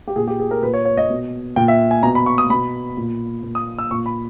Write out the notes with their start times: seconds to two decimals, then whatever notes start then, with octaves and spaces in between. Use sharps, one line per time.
0.08 G4
0.16 A#2 G#4
0.27 G4
0.39 G#4
0.51 A#4
0.62 A#2 B4
0.74 C#5
0.85 C#5
0.97 D#5
1.10 B2
1.56 A#2 G5
1.68 E5
1.91 G#5
2.03 B2 A#5
2.15 B5
2.26 C#6
2.38 D#6
2.50 B2 B5
2.97 A#2
3.43 A#2
3.55 D#6
3.78 E6
3.91 A#2 C#6
4.06 B5